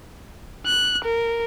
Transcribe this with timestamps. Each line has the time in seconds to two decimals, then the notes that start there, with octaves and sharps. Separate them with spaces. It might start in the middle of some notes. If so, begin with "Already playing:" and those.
0.66 F#6
1.05 A#4